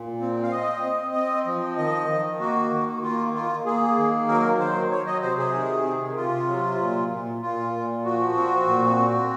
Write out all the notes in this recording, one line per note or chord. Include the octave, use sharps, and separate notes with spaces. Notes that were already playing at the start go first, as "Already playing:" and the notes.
Already playing: A#2
C4
F5
C4 D#5
C4
C4
F3
D#3 D#5
D#3
A#3 F#4
D#3
A#3 F4
A#3 F4
A#3 G#4
D#3
F#3 A#4
F#3 C5
F#3 C#5
D#5
C3 C5
G#4
D#3
C3
C3 F4
F#3
A#2
A#2
A#2 F4
A#2
F3 F#4
C4
A#2
C4